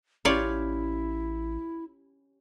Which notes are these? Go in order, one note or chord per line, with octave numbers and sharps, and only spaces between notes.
A1 C#4 E4 F4 G4 C#5 D5